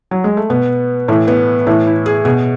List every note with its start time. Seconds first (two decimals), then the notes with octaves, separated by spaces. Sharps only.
0.11 F#3
0.24 G#3
0.37 A3
0.50 B2 B3
1.08 A2 E3 A3
1.28 B3
1.67 A2 E3 A3
1.87 E4
2.06 G#4
2.25 B2 G#4